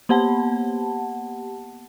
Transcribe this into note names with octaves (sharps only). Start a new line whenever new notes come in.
A#3 B3 G4 F#5 A5